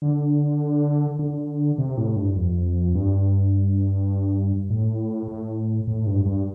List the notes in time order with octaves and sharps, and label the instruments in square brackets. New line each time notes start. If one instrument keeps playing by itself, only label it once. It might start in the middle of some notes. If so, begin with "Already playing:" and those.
[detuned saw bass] D3
D3
C3
A2
G2
F2
G2
A2
A2
A2
G2
G2